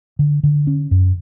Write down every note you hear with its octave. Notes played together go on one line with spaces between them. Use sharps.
D3
D3
C#4
F#2